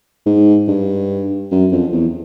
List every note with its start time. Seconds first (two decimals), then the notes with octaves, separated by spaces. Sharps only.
0.26 G#2
0.68 G2
1.51 F#2
1.72 F2
1.92 E2